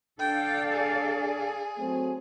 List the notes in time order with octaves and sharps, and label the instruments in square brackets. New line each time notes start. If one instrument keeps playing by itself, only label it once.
[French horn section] D4 [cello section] A4 D5 F5 [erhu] G5
[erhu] G#4
[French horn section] F#3 A3 C4